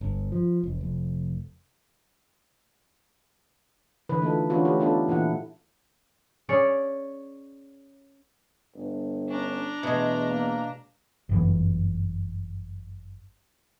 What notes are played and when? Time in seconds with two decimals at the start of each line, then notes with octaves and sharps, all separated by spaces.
0.01 G1
0.32 F3
0.64 E1
0.81 F1
4.09 D3 E3 B4
4.22 A3 D#4 F4 A4
4.50 E3 C#4 D4 F4 F#4 B4
4.65 A3 G4 B4
4.80 B3 D4 D#4 F4 A4 B4
5.08 A#2 E3 E4 F#5
6.49 C#4 G#4 C#5 D5
8.75 G1
9.29 C#4 D4 A#5
9.83 E2 B2 G#3 A3
10.30 A#3
11.29 G1 F#2 E3